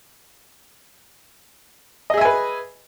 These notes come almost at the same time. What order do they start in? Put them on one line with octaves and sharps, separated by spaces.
D#5 G#4 E5 G#5 B4